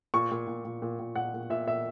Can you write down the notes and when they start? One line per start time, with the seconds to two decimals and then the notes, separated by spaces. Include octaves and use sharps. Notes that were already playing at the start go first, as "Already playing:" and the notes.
0.14 A#2 C#6
0.31 A#2
0.47 A#2
0.65 A#2
0.82 A#2
0.99 A#2
1.16 A#2 F#5
1.34 A#2
1.50 A#2 E5
1.67 A#2 E5